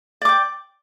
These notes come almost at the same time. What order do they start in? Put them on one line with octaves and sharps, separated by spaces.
D5 D6 G5